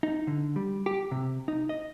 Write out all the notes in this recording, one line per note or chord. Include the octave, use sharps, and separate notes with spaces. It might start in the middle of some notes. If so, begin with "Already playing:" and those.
D#4
D3
G3
G4
C3
D#4
D#5